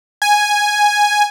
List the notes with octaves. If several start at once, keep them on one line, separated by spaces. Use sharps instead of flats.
G#5